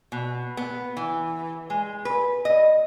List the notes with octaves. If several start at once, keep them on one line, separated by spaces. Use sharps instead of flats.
B2
B3
E3
G#3
B4
D#5